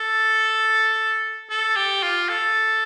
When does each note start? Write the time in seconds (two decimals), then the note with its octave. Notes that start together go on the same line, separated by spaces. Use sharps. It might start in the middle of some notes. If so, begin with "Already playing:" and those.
Already playing: A4
1.50 A4
1.76 G4
2.03 F4
2.29 A4